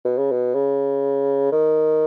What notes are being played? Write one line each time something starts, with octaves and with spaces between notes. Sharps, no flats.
B2
C#3
B2
C#3
D#3